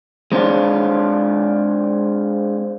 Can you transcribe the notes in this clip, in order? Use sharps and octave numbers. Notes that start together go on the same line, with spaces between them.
G#3 C4 D4 F4